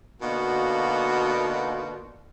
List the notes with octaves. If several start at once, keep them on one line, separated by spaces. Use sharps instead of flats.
B2 D3 A#3 D#4 F4 F#4